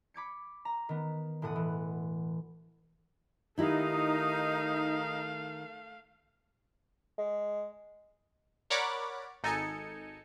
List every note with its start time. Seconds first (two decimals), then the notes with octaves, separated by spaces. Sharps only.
0.14 B5 D6 G#6 C#7
0.65 A#5
0.89 D#3 B3
1.42 E1 A2 F#5 D#6
1.56 E3
3.58 D#3 A3 D#4 E4 G4 F5
7.18 G#3
8.70 A#4 C#5 D5 F#5 B5 D6
9.43 G#1 D#4 A4 G#5 C#7